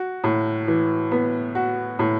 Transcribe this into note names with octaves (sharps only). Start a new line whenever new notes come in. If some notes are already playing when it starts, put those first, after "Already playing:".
Already playing: F#4
A2
E3
B3
F#4
A2